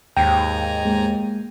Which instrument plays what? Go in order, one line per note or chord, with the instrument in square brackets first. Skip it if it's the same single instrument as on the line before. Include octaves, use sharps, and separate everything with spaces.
[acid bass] D#2 [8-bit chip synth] G#2 G#5 A#5 [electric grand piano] G5
[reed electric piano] G#3 A#3